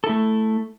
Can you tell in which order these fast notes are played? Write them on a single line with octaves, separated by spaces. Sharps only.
A4 E4 A3